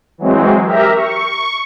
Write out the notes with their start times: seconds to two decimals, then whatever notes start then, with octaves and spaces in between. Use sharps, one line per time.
0.18 E3 F#3 G#3 C4
0.64 G4 A#4 E5 A#5
0.95 C#6